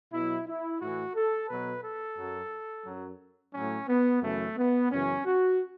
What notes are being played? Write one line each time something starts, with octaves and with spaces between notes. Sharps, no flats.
B2 F#3 E4
E4
A2 E3 F#4
A4
B2 F#3 B4
A4
F#2 F#3
F#2 F#3
A2 F#3 C#4
B3
F#2 C#3 E3 A3
B3
F#2 C#3 E3 C#4
F#4